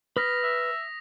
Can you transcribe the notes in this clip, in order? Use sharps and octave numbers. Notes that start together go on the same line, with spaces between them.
B4 D#6 F6 A#6 B6
E5